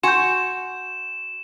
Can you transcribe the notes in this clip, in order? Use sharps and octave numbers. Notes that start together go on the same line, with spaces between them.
F#4 G#5 C6 G6 E7